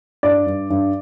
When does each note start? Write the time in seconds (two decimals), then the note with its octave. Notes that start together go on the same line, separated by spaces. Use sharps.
0.23 G2 D5
0.46 G2
0.70 G2